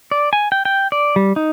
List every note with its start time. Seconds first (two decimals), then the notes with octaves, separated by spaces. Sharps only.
0.11 D5
0.33 G#5
0.52 G5
0.65 G5
0.92 D5
1.16 G3
1.36 D#4